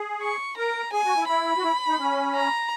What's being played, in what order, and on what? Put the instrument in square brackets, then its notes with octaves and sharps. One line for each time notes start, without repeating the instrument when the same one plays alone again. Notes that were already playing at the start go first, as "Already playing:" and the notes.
Already playing: [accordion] G#4
[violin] C#6
[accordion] A#4 [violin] A#5
[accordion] G#4 [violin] G#5
[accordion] F#4
E4
[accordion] E4 [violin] B5
[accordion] F#4
E4
D#4
C#4
[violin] A#5